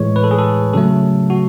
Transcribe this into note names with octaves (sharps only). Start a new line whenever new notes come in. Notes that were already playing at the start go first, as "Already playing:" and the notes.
Already playing: A2 E3 G#3 C#5
B4
A4
G#4
A4
C#3 F#3 A3 A4
F#4